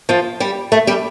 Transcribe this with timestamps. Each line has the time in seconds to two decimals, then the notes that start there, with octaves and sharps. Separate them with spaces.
0.09 F3 F4
0.40 G3 G4
0.72 A3 A4
0.87 G3 G4